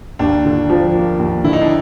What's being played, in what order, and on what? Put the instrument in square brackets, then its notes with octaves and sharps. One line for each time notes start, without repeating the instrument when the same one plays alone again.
[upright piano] D#2 [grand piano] D4
[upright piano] D3
F3
A#3
D#2
[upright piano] D3 [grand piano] E4
[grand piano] D#4
D4